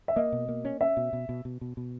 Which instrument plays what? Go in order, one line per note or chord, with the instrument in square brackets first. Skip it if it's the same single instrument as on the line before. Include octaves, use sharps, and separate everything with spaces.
[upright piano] E5
[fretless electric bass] A#3 [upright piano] D#5
[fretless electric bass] B2
A#3
C#4
[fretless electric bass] C#4 [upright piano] E5
[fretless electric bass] B2
B2
B2
B2
B2
B2